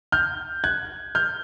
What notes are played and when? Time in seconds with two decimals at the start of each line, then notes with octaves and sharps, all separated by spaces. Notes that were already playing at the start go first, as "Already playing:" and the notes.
0.12 F6 G6
0.64 F#6 G#6
1.15 F6 G6